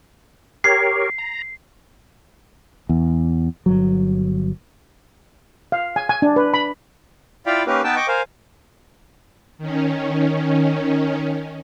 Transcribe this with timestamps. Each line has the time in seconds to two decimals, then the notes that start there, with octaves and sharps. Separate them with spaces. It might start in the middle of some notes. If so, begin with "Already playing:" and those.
0.64 G4 A#4 C#5 C7
1.18 A#5
2.89 E2
3.66 G1 F#3
5.72 F5
5.96 G#5
6.09 G#5
6.22 D4
6.36 B4
6.54 B5
7.46 E4 F4 D5 F5 G5 B5
7.67 A#3 C#4 D#4 G4 A#4 B4
7.84 B3 D#4 B4 G5 A5 E6
7.96 D#5 G5 C#6 D6
8.08 A#4 C5 F5 G#5
9.58 D#3 C#4